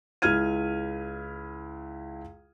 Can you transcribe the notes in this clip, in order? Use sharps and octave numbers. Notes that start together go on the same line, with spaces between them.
C#2 E4 F6 G#6 D#7